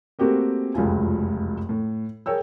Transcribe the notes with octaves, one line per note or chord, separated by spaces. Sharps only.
A3 A#3 C4 F#4 G4 A#4
F1 C#2 F#2 F4 G#5
A2
G#4 A#4 C#5 G5 E6